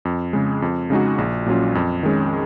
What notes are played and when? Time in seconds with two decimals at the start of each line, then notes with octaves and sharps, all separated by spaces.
0.05 F2
0.33 C#3 G#3
0.62 F2
0.90 C#3 G#3 D#4 F#4
1.18 A#1
1.46 A#2 F#3 C#4 F4
1.75 F2
2.03 D#3 G#3 C#4